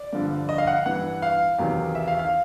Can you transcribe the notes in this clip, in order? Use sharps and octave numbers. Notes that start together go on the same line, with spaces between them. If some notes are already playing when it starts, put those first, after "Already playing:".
Already playing: D5
G2 D3 F3
D#5
F5
F#5
G2 E3 F#5
F5
E2 C3 D#3 F#3
E5
F5
F5